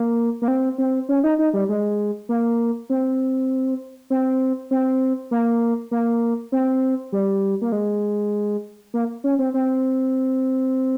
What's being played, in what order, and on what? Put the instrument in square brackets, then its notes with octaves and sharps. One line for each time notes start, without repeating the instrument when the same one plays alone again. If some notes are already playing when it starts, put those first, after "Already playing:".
Already playing: [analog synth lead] A#3
A#3
C4
C4
C#4
D#4
D#4
G3
G#3
A#3
C4
C4
C4
A#3
A#3
C4
G3
A#3
G#3
A#3
C#4
C4
C4